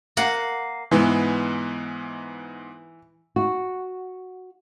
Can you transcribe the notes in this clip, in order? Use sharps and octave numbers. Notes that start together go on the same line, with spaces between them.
A#3 F#5
G#2 E3 G#3 B3
F#4